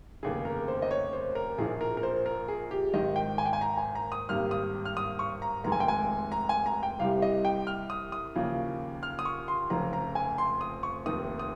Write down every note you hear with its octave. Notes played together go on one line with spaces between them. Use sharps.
F1 D#2 C#3 G#4
A#4
C5
D#5
C#5
C5
A#4
A#1 A#2 F3 G#4
A#4
A#4
C5
A#4
G#4
G4
G#1 G#2 D#3 D#5
G5
G#5
G5
G#5
A#5
G#5
A#5
D#6
G#1 G2 D#3 G3 A#3 F6
D#6
F6
D#6
C#6
A#5
F1 D#2 D#3 G#3 A#5
G#5
G5
G#5
A#5
G#5
A#5
G5
C2 C3 G3 F5
D#5
G5
F6
D#6
D#6
D#2 C#3 F3 A#3
F6
D#6
C#6
C6
F1 F2 C#3 A#5
A#5
G#5
C6
D#6
C#6
F1 D#2 D#3 D#6
D#6